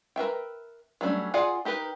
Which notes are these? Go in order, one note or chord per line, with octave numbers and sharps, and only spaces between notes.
A#4 B4 E5 G5
F#3 G3 A3 C#4 D4
F4 G#4 D5 F#5 G#5
D#4 G4 A#4 B4